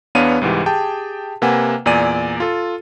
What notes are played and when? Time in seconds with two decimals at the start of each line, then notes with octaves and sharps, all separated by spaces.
0.15 E2 B3 D4 C#5 F5 D#7
0.41 C2 G#2 E3 G4
0.66 G4 G#4 G5 A5
1.42 C3 A#3 B4 F#5 G#5
1.86 E2 A#2 D5 G#5 D#7
2.40 F4 A4